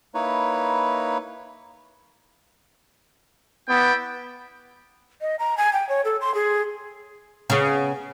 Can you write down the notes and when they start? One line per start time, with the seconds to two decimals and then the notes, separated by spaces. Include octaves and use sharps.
0.15 A#3 D#4 E4 B4 C#5
3.69 B3 E4 D5 G5
5.21 D#5
5.39 A#5
5.57 G#5
5.73 G5
5.89 C#5
6.05 A4
6.21 C6
6.35 G#4
7.50 C#3 B3